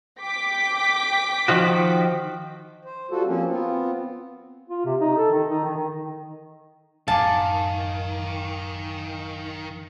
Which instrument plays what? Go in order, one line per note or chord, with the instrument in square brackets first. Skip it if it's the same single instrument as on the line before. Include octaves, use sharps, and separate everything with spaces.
[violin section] G5 D6 B6
[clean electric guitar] D#3 F3 F#4
[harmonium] C5
G3 F4 F#4 A4
F3 A#3 C4 C#4
B3 C4 F4
[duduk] F4
C3
D#4
A4
D#3
D#4
D#3
D#3
[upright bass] A1 F#2 [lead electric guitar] D#3 [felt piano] F5 G#5 D6 [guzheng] A5